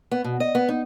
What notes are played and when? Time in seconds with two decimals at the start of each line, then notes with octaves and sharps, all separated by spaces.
0.11 B3
0.24 B2
0.40 D#5
0.55 B3
0.69 D#4